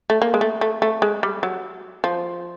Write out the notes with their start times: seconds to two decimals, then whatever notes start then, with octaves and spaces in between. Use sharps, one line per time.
0.10 A3
0.22 A#3
0.34 G#3
0.41 A3
0.61 A3
0.82 A3
1.02 G#3
1.23 G3
1.43 F#3
2.04 F3